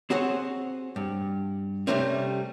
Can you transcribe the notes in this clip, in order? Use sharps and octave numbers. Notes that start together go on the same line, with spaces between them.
C4 F#4 G#4 C5 C#5
G2
C3 F#3 G3 A3 C4 C#4